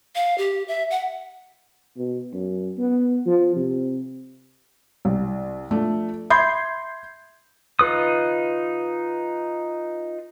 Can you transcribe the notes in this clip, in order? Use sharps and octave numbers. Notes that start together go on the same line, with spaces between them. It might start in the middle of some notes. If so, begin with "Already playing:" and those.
F5
G4
E5
F#5
B2
F#2
B3
F3
C3
C2
F3 A3 D4
E5 B5 C6 G6 G#6 C7
D#4 F4 B4 D#6